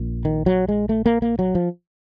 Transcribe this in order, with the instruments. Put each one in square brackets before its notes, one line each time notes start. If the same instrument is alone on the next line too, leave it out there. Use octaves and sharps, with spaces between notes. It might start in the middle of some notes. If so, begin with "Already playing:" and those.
Already playing: [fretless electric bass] A#1 A#2
D#3
F#3
G#3
A3
A#3
A#3
F#3
F3